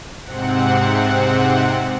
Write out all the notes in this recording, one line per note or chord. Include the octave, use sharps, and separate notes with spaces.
G#2 C3 C4 F#5